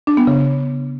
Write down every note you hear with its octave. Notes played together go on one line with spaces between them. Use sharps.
D4
B3
C#3